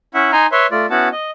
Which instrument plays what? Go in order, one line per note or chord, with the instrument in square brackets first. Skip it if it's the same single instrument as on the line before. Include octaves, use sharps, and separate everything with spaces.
[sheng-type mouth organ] C#4 E4 E5 F#5
D#4 G#5 A#5 C6
B4 C#5 E5 C6
A3 F4 D5
B3 C#4 E4 F#4 F#5 A5
D#5